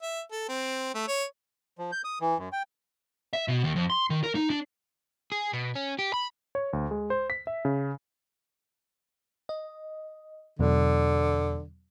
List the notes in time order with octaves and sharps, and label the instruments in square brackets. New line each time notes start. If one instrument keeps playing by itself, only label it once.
[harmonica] E5
A4
C4
A3
C#5
[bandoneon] F3
G6
D#6
E3
F#2
G5
[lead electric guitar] E5
B2
D#2
F2
C6
D#3
A#4
D#4
D4
[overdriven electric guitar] G#4
B2
C#4
G4
B5
[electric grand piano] C#5
D2
G#3
C5
B6
E5
C#3
[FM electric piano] D#5
[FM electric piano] E2 B2 F#3 [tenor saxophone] D3